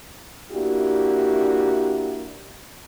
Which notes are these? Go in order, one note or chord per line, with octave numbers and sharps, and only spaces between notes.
A#3 D4 E4 F#4 G4